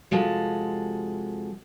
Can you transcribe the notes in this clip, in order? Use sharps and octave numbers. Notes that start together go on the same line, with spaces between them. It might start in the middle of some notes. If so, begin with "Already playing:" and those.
C3 F3 G#3 F#4 A4